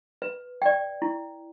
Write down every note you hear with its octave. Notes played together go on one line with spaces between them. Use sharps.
B4
D5 G5
E4